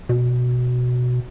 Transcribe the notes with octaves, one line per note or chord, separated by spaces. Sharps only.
B2